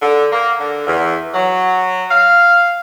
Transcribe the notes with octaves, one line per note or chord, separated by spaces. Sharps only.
D3
A#3
D3
E2
F#3
F5